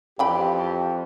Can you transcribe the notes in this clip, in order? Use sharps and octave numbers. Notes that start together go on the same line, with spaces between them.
F2 E3 G4 G5 B5